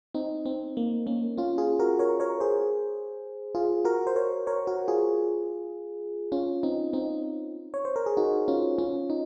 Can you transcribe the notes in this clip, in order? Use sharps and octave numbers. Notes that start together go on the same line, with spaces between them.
C4 D#4
C4
A#3
A#3 C#4
C#4 F4
F4 G#4
F#4 A#4
A#4 C#5
A#4 C#5
G#4 C5
F4 G#4
F#4 A#4
C5
A#4 C#5
A#4 C#5
F#4 A#4
F4 G#4
C#4 F4
C4 D#4
C4 D#4
C#5
C5
A#4
G#4
D#4 F#4
C#4 F4
C#4 F4
D#4